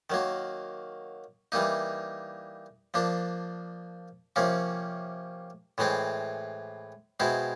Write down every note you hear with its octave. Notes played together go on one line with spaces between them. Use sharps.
D#3 F#3 A#3
E3 G3 A#3 D#4
F3 A#3 D4
C3 F3 A#3 C#4
A2 E3 G#3 C4
B2 G#3 C4 E4